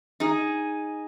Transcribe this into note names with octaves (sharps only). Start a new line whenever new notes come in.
D#4 G#4